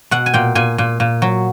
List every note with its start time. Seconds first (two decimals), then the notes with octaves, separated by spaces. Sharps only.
0.11 B2 F#5
0.26 G#5
0.34 A#2 G5
0.55 A#2 G#5
0.78 A#2
1.00 A#2
1.22 F#3